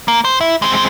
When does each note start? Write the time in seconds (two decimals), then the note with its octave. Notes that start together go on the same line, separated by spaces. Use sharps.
0.08 A#3
0.25 C5
0.41 E4
0.62 G#3 C4